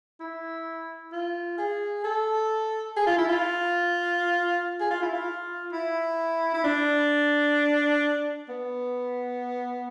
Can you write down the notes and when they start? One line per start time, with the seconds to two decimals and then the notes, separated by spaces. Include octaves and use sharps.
0.20 E4
1.12 F4
1.58 G#4
2.04 A4
2.97 G#4
3.07 F4
3.18 E4
3.29 F4
4.81 G#4
4.91 F4
5.03 E4
5.13 F4
5.73 E4
6.54 E4
6.64 D4
8.49 B3